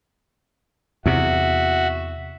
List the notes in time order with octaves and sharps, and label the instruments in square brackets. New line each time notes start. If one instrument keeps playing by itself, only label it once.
[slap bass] E2 C3 [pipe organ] F#4 [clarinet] E5